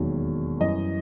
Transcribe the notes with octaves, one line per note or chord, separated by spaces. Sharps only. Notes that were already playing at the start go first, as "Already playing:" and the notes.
Already playing: E1 D#2 D#3 F#3
F#2 E3 G3 D#5